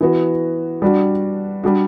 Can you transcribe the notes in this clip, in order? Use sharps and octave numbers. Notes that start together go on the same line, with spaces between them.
E3 B3 F#4
G3 D4 F#4
G3 D4 F#4